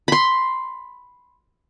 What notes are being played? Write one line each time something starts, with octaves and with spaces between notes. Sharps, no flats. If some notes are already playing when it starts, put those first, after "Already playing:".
B5 C6